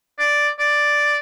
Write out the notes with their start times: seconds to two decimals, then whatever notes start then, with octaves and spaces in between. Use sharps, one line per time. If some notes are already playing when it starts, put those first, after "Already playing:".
0.19 D5
0.59 D5